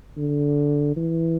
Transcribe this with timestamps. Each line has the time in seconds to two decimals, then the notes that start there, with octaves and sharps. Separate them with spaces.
0.17 D3
0.96 E3